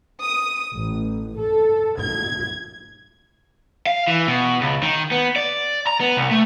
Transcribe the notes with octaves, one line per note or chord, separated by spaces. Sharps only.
D#6
A1
A4
G#6
F5
E3
B2
C#2
D#3
B3
D5
A#5
B3
C2
A3